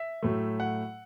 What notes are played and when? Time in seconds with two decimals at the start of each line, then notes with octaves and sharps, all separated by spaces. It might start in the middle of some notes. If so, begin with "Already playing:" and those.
Already playing: E5
0.22 A2 F#3 A3
0.60 F#5